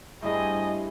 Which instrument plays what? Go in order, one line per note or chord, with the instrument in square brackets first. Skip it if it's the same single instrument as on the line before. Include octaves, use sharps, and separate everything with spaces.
[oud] G2 G3 C4 [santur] A3 E4 G#4 [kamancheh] D#5 G#5